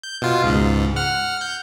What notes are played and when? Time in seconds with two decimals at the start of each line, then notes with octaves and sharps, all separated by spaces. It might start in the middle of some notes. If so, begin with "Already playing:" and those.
0.03 G6
0.22 B2 F4
0.44 C#2 G#2
0.96 F#5 F6
1.41 G6